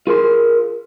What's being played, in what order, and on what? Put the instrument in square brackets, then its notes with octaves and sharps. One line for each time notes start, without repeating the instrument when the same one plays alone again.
[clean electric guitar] F4 G#4 A#4 C6